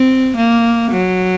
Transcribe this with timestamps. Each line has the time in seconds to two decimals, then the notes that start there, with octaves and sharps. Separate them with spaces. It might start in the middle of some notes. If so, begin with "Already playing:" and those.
Already playing: C4
0.36 A#3
0.92 F#3